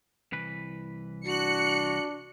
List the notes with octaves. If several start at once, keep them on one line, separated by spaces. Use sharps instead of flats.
C2 E3 B4
D4 F#4 F#6 C#7